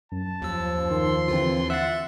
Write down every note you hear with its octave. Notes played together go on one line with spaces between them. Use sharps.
F#2 A5
D#2 F3 E6
D#3 C6
D#2 D3 E3 C4 F4
E5 F#5 E6 A6